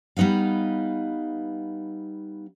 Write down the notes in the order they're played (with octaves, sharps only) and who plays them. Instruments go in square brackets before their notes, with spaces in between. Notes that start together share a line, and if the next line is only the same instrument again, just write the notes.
[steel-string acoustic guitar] G3 B3 D#4 B4 F5